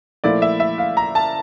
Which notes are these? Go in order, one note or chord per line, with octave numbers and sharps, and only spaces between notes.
A#2 F3 A3 E4 D5
E5
E5
F5
A#5
A5